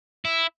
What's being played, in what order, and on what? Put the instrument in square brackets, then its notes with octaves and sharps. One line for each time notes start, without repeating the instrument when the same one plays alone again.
[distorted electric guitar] E4